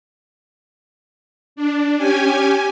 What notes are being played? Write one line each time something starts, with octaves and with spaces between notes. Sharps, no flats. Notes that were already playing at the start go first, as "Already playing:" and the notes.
D4
C#4 G4 G#5